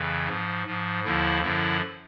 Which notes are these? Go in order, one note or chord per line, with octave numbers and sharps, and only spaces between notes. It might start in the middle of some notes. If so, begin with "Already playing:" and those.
Already playing: F2 C#3 E3
G#2 F3
G#2 F3
D#2 D3 F3 E4
F#2 D3 F3 E4